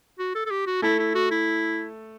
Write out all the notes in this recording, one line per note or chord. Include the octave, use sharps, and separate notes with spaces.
F#4
A4
A4
G4
F#4
A3 E4 A4
E4
F#4
E4